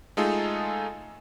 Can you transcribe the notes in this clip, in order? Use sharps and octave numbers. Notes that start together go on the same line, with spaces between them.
G#3 A3 D#4 F4 G#4 A4